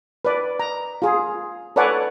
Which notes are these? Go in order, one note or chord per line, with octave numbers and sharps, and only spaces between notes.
B4 D5
A#5
F4 G#4
A4 B4 C#5 D5 F#5 G#5